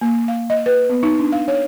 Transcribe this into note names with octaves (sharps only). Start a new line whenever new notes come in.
A#3
F5
D#5
B4
B3
D#4
D4
F5
C#5